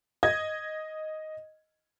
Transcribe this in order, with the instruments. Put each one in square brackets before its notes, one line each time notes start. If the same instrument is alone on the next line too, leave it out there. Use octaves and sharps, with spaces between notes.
[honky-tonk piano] D#5 G#6